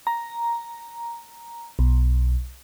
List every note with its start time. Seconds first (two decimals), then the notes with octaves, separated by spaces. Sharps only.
0.07 A#5
1.79 B1